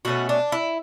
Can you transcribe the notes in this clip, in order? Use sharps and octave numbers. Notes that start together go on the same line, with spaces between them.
B2 A3 C#4 F#4
D4
E4